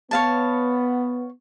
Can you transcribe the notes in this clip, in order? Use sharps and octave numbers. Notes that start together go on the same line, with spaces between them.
B3 C#5 F5 A5